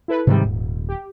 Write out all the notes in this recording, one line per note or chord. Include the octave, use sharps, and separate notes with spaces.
E4 A4 B4
G#2 C3 D#3 G3
D#1
G4